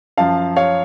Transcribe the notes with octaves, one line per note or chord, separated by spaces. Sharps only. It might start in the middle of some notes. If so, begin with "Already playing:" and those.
F#2 F3 F5 A5
C#5 F5